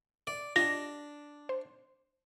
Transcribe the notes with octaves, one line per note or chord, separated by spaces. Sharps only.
D5
D4 F4 G4 D#5 A#6
C5